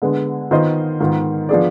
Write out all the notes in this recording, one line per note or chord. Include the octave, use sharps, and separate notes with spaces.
D3 G#3 B3
D#3 B3 F4 C5 D#5
G#2 D#3 B3 F4
F3 B3 D4 G#4 D5